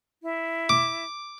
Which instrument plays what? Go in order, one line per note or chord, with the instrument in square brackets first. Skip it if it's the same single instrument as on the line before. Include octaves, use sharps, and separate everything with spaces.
[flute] E4
[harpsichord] D6